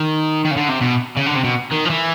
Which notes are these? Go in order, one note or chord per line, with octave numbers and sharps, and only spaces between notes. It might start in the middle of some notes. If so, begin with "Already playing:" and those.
Already playing: D#3
D#3
C#3
D3
C3
B2
C#3
D3
C3
B2
D#3
F3
E3